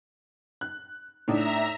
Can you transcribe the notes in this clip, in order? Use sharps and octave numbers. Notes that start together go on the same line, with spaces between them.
F#6
A2 D4 D#4 E5 A#5